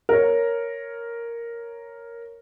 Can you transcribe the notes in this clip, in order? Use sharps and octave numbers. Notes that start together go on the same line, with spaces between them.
A#4 C#5